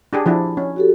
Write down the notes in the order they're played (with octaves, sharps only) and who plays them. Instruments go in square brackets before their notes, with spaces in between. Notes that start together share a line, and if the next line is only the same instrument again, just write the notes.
[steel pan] D4 G4 G#4
F3 D4 E4
C#4
[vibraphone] F#4 G4 A4